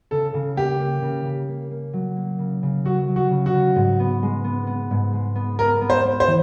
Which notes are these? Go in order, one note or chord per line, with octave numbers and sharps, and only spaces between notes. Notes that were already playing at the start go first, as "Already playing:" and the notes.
C#3 A4
C#3
A#3 G4
A#3
C#3
C#3
A#3
A#3
F#3
A#3
C#3
C#3
F#3 F#4
F#3
F#4
C#3
F#4
C#3
G#2
B3
G#3
B3
B3
G#2
G#3
B3
B3 A#4
B3
C5
B3
C5
E3